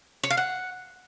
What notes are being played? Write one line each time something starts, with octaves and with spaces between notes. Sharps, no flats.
C#5
F5
F#5